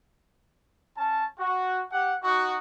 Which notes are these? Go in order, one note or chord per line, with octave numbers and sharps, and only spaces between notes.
C#4 A5
F#4
G4 F#5
D#4 F#4